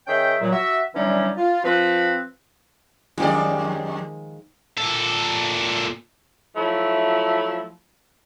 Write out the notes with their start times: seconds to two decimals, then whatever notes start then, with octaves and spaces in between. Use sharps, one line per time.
0.07 D#3 C#4 G#4 E5 G5
0.40 A#2 F#3
0.52 F#4 E5
0.95 D3 E3 F#3 G3 C#4 D#4
1.37 F4
1.64 F3 C4 B4
3.18 F2 D#3 F3 G#3 G4 D5
4.78 A#2 A4
6.55 F3 F#3 A3 E4